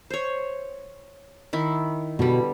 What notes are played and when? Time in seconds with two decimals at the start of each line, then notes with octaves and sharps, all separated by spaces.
0.10 C5 C#5
1.53 D#3 E4
2.19 B2 D3 G3